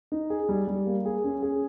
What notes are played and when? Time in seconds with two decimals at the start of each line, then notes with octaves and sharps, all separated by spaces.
0.12 D#4
0.30 G#4
0.49 G3
0.67 G3
0.86 A#3
1.06 G#4
1.24 C#4
1.42 G#4